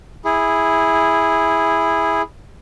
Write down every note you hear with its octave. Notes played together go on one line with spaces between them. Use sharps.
E4 G#4